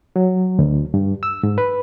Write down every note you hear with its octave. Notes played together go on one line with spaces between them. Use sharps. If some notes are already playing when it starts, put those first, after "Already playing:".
F#3
D2
G2
E6
G#2
B4